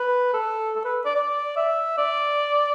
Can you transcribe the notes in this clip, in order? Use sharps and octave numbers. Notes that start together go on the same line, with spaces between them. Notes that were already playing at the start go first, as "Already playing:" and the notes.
Already playing: B4
A4
A4
B4
D5
D5
E5
D5